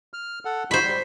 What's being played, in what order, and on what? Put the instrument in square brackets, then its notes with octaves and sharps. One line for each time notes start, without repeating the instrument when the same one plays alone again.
[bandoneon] F6
A4 F#5
[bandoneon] D#4 F4 F#4 [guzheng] C5 B5
[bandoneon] G3